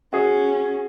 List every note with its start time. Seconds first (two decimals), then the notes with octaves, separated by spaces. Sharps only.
0.13 C#4 F#4 G#4